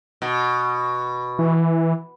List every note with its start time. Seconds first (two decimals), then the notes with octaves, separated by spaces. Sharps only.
0.22 B2
1.39 E3